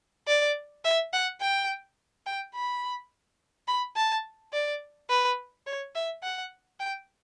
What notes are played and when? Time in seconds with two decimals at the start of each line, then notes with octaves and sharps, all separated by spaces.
0.28 D5
0.85 E5
1.13 F#5
1.41 G5
2.26 G5
2.55 B5
3.68 B5
3.96 A5
4.53 D5
5.10 B4
5.67 C#5
5.95 E5
6.23 F#5
6.80 G5